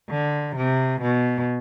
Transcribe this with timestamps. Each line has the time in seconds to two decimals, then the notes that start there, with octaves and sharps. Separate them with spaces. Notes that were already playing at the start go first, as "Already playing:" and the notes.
0.11 D3
0.55 C3
1.02 B2